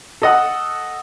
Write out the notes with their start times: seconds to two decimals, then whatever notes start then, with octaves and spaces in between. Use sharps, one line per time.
0.22 A4 D#5 F#5